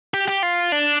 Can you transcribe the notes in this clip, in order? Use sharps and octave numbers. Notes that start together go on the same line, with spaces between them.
G4
G4
F4
D4